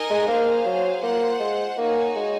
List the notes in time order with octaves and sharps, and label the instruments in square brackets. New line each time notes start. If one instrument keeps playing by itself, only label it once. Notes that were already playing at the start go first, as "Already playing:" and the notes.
Already playing: [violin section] D#4 A#4 D#5 G#5
[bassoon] G#3
[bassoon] A#3 [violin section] G#4 C5 F5
[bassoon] F#3
[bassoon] A#3 [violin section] F4 C5 F#5
[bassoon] G#3
[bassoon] A#3 [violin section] D#4 F#4 C#5 G#5
[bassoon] G#3